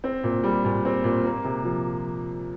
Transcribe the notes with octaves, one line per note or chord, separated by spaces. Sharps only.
C4
A#2
G3
A#2
C4
A#2
A#3
C3
F3